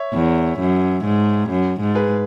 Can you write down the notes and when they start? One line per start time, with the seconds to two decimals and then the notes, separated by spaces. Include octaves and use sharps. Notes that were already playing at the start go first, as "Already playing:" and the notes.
Already playing: C#5 E5
0.14 E2
0.59 F#2
1.05 G#2
1.50 F#2
1.80 G#2
1.95 G#4 B4